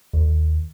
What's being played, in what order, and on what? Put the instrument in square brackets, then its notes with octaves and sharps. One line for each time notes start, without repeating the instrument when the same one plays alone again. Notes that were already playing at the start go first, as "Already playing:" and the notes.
[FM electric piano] D#2